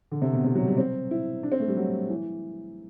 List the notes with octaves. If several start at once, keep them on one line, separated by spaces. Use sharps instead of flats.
D3
C3
B2
C3
F#3
G3
C4
E4
D4
C4
A3
G3
F#3
E3